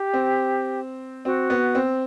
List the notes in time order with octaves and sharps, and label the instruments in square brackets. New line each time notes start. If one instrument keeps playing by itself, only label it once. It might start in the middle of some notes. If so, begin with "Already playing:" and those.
Already playing: [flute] G4
[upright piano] C4
[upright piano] C4 [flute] F#4
[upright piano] B3
C4